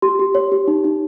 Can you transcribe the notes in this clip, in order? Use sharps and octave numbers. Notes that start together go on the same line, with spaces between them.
G4 C6
G4
C#5
G4
D#4
D#4